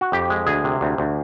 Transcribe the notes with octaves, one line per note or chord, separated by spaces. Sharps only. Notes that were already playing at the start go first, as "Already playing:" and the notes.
F#4
F2 G4
G#3
D2 G#4
C3
D2
D2